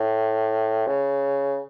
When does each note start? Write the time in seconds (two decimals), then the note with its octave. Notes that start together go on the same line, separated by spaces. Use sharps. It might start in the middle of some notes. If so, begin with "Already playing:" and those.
Already playing: A2
0.87 C#3